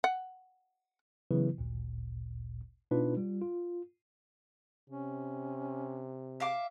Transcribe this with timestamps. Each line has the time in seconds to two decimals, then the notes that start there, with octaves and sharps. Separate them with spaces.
0.04 F#5
1.31 C#3 E3 F#3 B3 E4 B4
1.58 G#1 D2 A#2
2.91 B2 B3 D4 D#4 F4 B4
3.17 G3 F4
3.41 F4
4.90 C3 C#4
6.40 E5 F5 D6